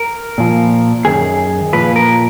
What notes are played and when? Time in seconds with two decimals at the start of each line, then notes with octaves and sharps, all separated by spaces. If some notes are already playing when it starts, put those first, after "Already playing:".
Already playing: A#4
0.38 A#2 F3
1.05 F#2 D#3 G#4
1.73 A#2 F3 B4
1.96 A#4